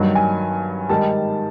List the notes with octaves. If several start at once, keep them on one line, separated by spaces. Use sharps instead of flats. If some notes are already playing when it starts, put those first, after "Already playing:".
Already playing: G2 D#3 F#3
G#5
G#2 D#3 G3 A5